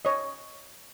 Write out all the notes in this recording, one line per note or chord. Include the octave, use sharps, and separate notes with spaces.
C#5 D#5